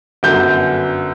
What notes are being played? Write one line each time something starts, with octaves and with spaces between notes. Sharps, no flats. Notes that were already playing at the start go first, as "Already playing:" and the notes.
G1 F#2 D3 G6